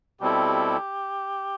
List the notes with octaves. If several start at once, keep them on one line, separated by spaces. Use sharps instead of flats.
B2 G3 C4 E4 G4 A4